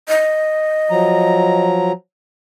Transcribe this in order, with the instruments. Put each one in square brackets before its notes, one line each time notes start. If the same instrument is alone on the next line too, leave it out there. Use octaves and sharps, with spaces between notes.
[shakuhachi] D#5
[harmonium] F3 F#3 A#5